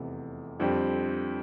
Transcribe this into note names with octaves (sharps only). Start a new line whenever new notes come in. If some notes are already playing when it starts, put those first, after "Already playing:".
Already playing: F1 E2 C3
F2 D3 G3 C4 G4